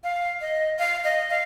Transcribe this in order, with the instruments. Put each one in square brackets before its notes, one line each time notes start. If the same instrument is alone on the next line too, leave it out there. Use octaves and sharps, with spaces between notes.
[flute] F5
D#5
F5
D#5
F5